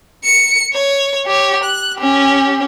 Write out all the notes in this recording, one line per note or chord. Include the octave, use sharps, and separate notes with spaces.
C#7
C#5
G4 C#5
F#6
C#4 G4